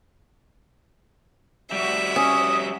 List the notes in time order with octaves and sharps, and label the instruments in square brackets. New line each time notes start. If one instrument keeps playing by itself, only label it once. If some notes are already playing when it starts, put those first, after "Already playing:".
[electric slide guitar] G3 F#4 [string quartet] E5
[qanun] C#4 [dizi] D#6